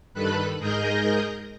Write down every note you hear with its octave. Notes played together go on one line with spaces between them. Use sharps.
G2 D#3 A4 B4 B5 F#6
G#2 G#4 A#4 D#5 G6 A#6